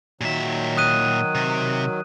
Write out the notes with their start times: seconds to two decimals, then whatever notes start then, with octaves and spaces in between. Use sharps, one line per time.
0.21 A#2 D#3 F#3 E5
0.77 D#6 F#6 D#7
1.35 C3